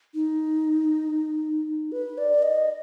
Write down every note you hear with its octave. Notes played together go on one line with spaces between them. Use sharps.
D#4
B4
D5
D#5